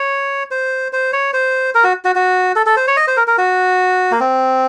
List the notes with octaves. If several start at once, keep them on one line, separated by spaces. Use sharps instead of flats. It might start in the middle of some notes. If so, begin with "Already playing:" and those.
Already playing: C#5
C5
C5
C#5
C5
A#4
F#4
F#4
F#4
A4
A4
C5
C#5
D#5
C5
A#4
A#4
F#4
A#3
C4